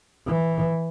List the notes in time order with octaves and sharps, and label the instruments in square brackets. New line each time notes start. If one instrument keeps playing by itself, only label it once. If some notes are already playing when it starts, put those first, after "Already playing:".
[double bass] E3